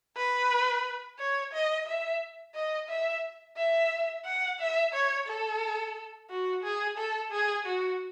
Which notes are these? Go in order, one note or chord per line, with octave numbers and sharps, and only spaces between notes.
B4
C#5
D#5
E5
D#5
E5
E5
F#5
E5
C#5
A4
F#4
G#4
A4
G#4
F#4